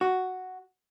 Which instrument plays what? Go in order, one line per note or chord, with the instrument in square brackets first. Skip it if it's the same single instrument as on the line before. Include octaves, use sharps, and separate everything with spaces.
[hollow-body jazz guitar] F#4